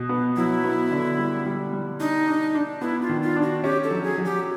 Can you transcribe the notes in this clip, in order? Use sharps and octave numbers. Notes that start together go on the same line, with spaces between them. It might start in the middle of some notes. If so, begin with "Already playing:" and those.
Already playing: B2
B3
F#3 E4
B3
D3
G3
G3
G3
D4 D#4
D4
D4
B3 E4
F4
D#3
F4
D4
F#4
C#4 G4
A4
F#3
G#4
F#3
G4